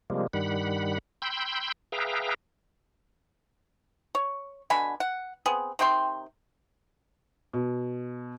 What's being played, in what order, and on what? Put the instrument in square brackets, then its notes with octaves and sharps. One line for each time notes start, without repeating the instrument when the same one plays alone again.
[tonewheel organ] C3 F3 G3 G#3 A#3
G2 D#3 G3 F#5 B5
G5 B5 C6 E6 G6
G#4 B4 E5 F5 G5 A#5
[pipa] C#5
B2 D3 G#5 B5
F#5
B3 C4 G#4
C3 D#3 G5 C6
[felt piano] B2